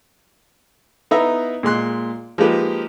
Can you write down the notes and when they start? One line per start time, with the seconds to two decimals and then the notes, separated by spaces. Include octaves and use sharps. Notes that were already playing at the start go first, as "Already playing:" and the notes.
1.11 B3 D#4 E4 B4 E5 A#5
1.63 A#2 G#3 C6 F#6
2.38 F3 G#3 A#3 D#4 G4 B4